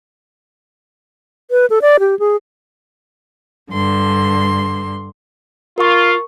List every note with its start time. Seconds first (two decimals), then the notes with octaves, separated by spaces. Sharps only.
1.51 B4
1.70 A4
1.82 D5
2.00 G4
2.19 G#4
3.71 G2 D3 C6
5.78 F4 A#4 C#6